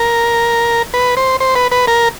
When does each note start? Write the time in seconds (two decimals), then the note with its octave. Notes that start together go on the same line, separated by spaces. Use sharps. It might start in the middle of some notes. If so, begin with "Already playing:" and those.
Already playing: A#4
0.94 B4
1.17 C5
1.40 C5
1.55 B4
1.72 B4
1.87 A#4